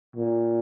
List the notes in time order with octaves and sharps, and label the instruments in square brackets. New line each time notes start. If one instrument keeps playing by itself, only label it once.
[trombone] A#2